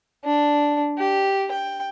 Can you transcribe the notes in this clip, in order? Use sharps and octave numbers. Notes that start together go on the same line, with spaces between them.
D4
G4
G5